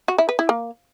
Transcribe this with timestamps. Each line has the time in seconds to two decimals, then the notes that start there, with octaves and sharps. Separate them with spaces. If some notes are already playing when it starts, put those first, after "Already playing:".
0.08 F#4
0.18 E4
0.29 B4
0.39 E4
0.49 A#3